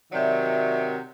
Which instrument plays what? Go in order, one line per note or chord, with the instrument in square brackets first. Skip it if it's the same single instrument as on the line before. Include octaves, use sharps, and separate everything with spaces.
[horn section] C3 D#3 F#3 [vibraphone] D5 E5